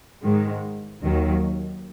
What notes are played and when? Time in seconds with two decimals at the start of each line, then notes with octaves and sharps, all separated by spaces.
0.24 G#2 D#3 G#3
1.03 D#2 D#3 F#3